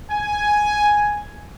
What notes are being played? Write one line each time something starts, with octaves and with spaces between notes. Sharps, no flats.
G#5